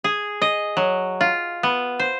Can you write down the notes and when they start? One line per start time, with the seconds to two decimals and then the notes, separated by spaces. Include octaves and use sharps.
0.04 G#4
0.42 D#5
0.77 F#3
1.21 F4
1.63 B3
1.99 C5